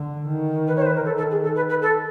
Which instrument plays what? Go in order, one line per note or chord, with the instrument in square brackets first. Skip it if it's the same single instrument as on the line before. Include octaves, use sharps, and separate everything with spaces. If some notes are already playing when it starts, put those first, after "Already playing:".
Already playing: [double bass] D3
D#3
[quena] B4
C#5
C5
B4
A#4
[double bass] D#3 [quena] A4
[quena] A4
G#4
A4
B4
B4
A4